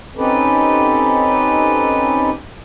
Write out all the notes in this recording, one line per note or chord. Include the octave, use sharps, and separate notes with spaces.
C4 C#4 D#4 G4 A4 B4